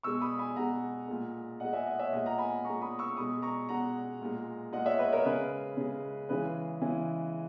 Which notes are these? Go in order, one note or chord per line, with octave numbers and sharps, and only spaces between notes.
B2 G#3 C#6 E6
B5 D#6
G#5 B5
B2 G#3 F#5 A#5
A#2 G#3
A#2 G#3 D#5 F#5
E5 G#5
D#5 F#5
C#5 E5
A#2 G#3 D#5 F#5
F#5 A#5
G#5 B5
A#2 G#3 A#5 C#6
B5 D#6
C#6 E6
B2 G#3 B5 D#6
A#5 C#6
B2 G#3 F#5 A#5
A#2 G#3
A#2 G#3 D#5 F#5
C#5 E5
B4 D#5
A#4 C#5
C#3 G#3 G#4 B4
C#3 G#3
C#3 E3 G#3 G#4 B4
C#3 E3 G#3